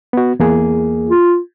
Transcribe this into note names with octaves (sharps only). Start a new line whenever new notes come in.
B3 F#4
E2 A#3 G#4
F4